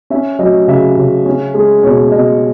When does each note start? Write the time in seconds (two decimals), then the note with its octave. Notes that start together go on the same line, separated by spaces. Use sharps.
0.10 C#4 E5
0.39 F#3 D#5
0.68 C#3 E5
0.97 C#3
1.25 C#4
1.54 G#3
1.83 B2 C#5
2.12 B2 D#5